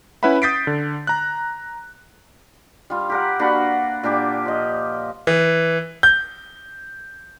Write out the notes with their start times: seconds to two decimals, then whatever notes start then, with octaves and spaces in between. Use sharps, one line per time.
0.23 C#4 E4 B4 E5 F#5 B5
0.42 D#6 G6 A6 B6 C7 D7
0.67 D3
1.07 A#5 F#6
2.90 G3 F4
3.10 G4 A#4 F#5
3.39 A#3 D4 F#4 B4
4.03 A#2 D4 G4 D6
4.45 F3 D#5
5.27 E3
6.03 G6